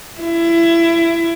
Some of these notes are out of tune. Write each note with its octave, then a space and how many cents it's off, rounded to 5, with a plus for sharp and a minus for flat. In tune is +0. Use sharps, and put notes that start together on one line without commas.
E4 +25